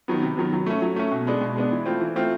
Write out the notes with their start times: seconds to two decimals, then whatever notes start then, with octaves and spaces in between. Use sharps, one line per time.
0.08 D#3 F#3 B3
0.22 C3
0.37 D#3 F#3 B3
0.53 F#3
0.66 A3 C#4
0.82 F#3
0.96 A3 C#4
1.11 B2
1.27 G#3 B3 D4
1.41 B2
1.56 G#3 B3 D4
1.72 E3
1.85 A3 C4 F4
2.01 E3
2.16 A3 C4 F4